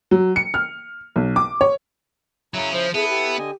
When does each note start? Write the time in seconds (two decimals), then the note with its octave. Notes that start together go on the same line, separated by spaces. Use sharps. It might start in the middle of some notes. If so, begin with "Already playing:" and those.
0.11 F#3
0.36 C#7
0.54 F6
1.16 B1
1.36 D6
1.61 C#5
2.54 C#3 F#3 C#4 E4 A#5
2.73 F3 C5
2.94 B3 E4 G#4 A4 B4
3.09 G4
3.39 D3 D#5 G#5